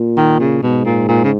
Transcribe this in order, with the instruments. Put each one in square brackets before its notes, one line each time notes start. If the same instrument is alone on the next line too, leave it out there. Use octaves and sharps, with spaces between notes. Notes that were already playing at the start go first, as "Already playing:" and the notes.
Already playing: [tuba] A#2
[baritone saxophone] D#3
C#3
[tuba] G#2 [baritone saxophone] B2
[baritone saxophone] A#2
A#2
C#3